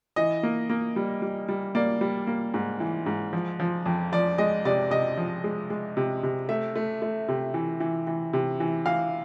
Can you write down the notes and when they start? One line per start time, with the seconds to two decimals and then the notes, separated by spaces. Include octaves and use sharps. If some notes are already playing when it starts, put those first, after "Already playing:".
0.16 E3 D#5
0.43 A#3
0.70 A#3
0.96 G3
1.22 G3
1.49 G3
1.75 A#3 D5
2.01 G3
2.27 A#3
2.54 G#2
2.80 E3
3.06 G#2
3.33 F3
3.60 F3
3.86 F2
4.12 F3 D5
4.38 G#3 D#5
4.65 C3 D5
4.90 C3 D#5
5.17 F3
5.44 G#3
5.70 G#3
5.97 C3
6.23 C3
6.49 A3 E5
6.75 A3
7.02 A3
7.28 C3
7.54 E3
7.80 E3
8.07 E3
8.33 C3
8.60 E3
8.86 E3 F5